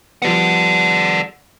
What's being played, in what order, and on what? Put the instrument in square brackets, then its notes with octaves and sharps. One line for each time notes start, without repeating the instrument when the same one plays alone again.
[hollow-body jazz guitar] F3 G3 B3 [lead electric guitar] D5 F#5